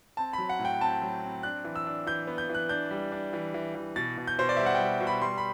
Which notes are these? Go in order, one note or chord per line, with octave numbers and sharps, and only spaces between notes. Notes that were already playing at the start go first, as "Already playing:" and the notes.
C4 A5
F#3 B5
F#5
A2
G5
C4 A5
F#3
C4
D4 F#6
E3
E6
D4
E3 G6
B3
G6
E3
F#6
D4 G6
G3
D4
E3
E3
E3
B2 A6
B2
G6
B2 C5
D5
G3 E5
F#5
G5
G3
B2
B5
G3 C6
B5